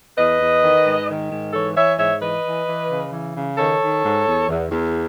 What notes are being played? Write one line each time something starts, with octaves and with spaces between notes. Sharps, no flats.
E2 B4 D#5
E2
D#3
G#2
D#3
G#2
E3 A4 C#5
E3 C#5 E5
G#2 C#5 E5
E3 B4 D#5
E3
E3
C#3
E3
C#3
D#3 A4 C#5
D#3
G#2
E2
E2
E2